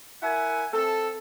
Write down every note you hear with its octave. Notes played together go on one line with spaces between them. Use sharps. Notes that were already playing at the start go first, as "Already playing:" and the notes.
E4 A#4 E5 F#5 G#5
C4 A4